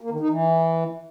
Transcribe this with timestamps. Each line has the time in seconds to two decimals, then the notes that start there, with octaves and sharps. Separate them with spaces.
0.01 A#3
0.10 D#3
0.20 D#4
0.29 E3